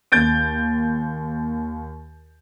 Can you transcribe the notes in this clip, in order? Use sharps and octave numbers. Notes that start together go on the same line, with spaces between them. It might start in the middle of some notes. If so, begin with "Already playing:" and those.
D#2 G6 A6 D7